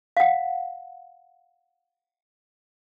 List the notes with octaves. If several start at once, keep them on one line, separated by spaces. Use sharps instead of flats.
F5 F#5